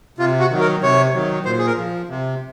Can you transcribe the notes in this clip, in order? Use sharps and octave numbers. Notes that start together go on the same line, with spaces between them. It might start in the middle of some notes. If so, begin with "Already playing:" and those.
C3 F4
F#4
D#3 F#3
A#4
C3 C#5
D#3 F#3
A#2 C5
G#4
A#4
F3
C3